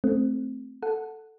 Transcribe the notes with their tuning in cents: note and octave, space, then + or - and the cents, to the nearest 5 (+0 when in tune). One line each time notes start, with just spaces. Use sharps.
A3 +0 C4 +0
A4 +0 F#5 +0